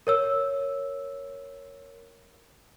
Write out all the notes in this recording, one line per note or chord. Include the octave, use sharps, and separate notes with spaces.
A#4 C#5 E6